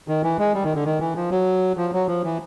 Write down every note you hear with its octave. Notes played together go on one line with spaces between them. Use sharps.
D#3
E3
G#3
G3
D#3
D3
D#3
E3
F3
F#3
F3
F#3
F3
E3